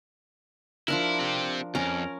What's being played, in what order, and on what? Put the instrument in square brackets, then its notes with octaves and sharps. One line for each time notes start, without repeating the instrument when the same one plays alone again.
[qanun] F3 D4 A#4 [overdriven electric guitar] E4
[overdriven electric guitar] C4 G4
[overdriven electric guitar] F2 [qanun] C#4 A#4 A#5